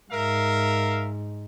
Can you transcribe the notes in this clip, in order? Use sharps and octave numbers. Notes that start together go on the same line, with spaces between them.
G#2 A#4 E5 F5